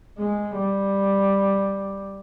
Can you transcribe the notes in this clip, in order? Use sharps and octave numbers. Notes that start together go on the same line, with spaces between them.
G#3
G3